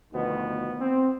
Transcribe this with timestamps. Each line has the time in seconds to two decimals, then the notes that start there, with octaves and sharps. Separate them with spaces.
0.13 D2 B2 D#3 F3 B3
0.80 C4